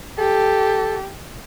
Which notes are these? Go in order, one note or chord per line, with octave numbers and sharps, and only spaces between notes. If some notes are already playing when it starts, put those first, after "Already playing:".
G4 A4